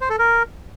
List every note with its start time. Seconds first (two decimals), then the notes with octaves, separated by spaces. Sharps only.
0.01 C5
0.10 A4
0.19 A#4